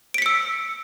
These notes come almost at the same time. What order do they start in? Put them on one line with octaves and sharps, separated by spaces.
D7 B6 C#7 E6